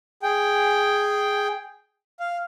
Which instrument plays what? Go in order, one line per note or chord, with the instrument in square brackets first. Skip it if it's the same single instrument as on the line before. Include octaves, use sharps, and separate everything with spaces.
[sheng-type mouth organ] G#4 G5
F5